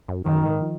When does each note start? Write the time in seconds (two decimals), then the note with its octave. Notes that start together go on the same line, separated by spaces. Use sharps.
0.08 F#2
0.26 F#2 D#3
0.44 G#2
0.61 F3